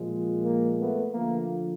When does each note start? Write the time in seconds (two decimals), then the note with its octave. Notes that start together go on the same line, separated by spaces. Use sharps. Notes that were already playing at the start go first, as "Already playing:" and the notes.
Already playing: A#2 F3 G#3
0.43 A#3
0.78 A3 B3
1.13 D3 F3 A3 A#3